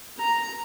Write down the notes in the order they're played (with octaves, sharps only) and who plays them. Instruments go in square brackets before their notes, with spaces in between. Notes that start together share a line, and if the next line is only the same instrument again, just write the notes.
[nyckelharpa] A#5